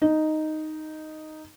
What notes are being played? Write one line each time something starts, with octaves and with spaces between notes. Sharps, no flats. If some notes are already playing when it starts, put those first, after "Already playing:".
D#4